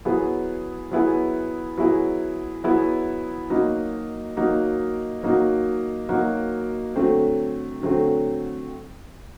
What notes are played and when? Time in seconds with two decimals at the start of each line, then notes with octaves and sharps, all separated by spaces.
0.05 F#3 B3 E4 G#4
0.91 F#3 B3 E4 G#4
1.78 F#3 B3 E4 G#4
2.64 F#3 B3 E4 G#4
3.50 F#3 A#3 D#4 F#4
4.37 F#3 A#3 D#4 F#4
5.23 F#3 A#3 D#4 F#4
6.09 F#3 A#3 D#4 F#4
6.95 D3 F#3 A3 C4
7.82 D3 F#3 A3 C4